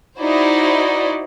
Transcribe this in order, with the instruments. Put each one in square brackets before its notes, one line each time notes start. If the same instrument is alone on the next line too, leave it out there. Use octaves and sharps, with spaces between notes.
[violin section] D#4 E4 F#4 C5 D5